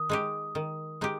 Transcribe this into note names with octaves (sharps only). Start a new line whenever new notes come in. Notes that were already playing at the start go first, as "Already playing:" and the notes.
Already playing: D#3 D#6
G#3 D#4 G4
D#3
G#3 D#4 G4